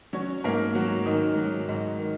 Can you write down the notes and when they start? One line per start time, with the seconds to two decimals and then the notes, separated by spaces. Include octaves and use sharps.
0.13 F#3 C#4 C#5
0.44 G#2 A#3 A#4
0.75 F#3 F#4
1.06 G#2 D#3 D#4
1.37 F#3
1.69 G#2
1.99 D#3